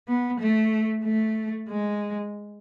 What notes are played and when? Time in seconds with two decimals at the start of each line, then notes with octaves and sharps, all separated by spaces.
0.08 B3
0.40 A3
1.05 A3
1.69 G#3